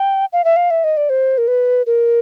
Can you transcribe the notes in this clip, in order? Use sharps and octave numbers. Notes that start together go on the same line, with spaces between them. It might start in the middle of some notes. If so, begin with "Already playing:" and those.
Already playing: G5
F5
E5
F5
E5
D#5
D5
C5
A#4
B4
A#4